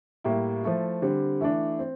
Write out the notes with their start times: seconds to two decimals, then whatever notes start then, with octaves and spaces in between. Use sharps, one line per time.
0.24 A2 G3 A#3 E4
0.63 F3 A3 E4
1.02 D3 G3 C4
1.41 E3 A3 D4
1.79 C4